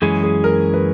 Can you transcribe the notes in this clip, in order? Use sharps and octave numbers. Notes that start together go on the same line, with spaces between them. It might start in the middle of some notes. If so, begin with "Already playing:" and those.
F#2 E3 G#3 C#4 G#4
G#4
A#4
B4